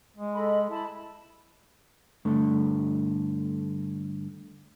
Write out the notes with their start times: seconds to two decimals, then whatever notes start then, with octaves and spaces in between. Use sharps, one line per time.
0.17 G#3
0.33 A4 D#5 B5
0.70 E4 A5 B5
2.25 G2 D3 A3